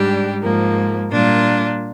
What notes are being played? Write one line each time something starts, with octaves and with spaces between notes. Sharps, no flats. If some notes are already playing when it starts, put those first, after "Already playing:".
Already playing: G#2 G3 D4 G4
G#2 F3 A#3
A#2 G3 A#3 D4 F4